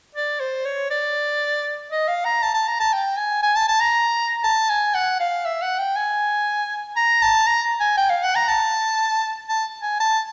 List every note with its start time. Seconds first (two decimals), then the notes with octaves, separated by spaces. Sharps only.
0.15 D5
0.40 C5
0.66 C#5
0.91 D5
1.91 D#5
2.08 F5
2.25 A#5
2.43 A5
2.54 A5
2.68 A#5
2.80 A5
2.93 G5
3.17 G#5
3.43 G#5
3.56 A5
3.68 A5
3.81 A#5
4.44 A5
4.70 G#5
4.94 F#5
5.20 F5
5.45 E5
5.62 F#5
5.79 G5
5.96 G#5
6.96 A#5
7.22 A5
7.47 A#5
7.80 G#5
7.97 G5
8.10 F5
8.23 F#5
8.36 A#5
8.48 A5
9.49 A5
9.83 G#5
10.00 A5